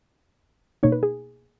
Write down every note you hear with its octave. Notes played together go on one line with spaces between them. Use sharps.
B2 A#3 D#4 C#5
B4
G#4